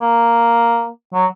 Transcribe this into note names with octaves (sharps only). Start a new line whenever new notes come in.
A#3
F#3